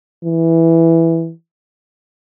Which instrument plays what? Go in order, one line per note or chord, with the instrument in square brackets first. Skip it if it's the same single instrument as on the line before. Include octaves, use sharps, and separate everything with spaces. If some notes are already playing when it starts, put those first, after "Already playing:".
[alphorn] E3